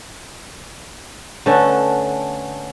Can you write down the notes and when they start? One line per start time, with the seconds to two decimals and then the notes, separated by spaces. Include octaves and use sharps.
1.46 D3 A3 B3 C#4